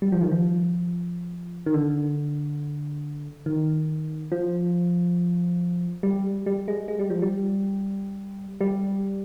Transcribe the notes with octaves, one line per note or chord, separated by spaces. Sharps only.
G3
F3
D#3
F3
D#3
D3
D#3
F3
G3
G3
G#3
G#3
G3
F3
G3
G3